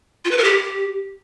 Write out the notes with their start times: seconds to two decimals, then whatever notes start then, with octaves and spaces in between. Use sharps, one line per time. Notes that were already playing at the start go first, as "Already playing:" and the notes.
0.25 F4
0.31 B4
0.38 A#4
0.44 G4